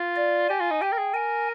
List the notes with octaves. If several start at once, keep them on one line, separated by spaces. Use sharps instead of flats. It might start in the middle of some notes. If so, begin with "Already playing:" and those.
Already playing: F4
D5
G4 G#5
F4
D#4
G4 G5
A#4
G#4
A#4 G#5